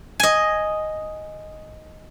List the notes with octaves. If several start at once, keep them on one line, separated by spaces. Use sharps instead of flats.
D#5 G#5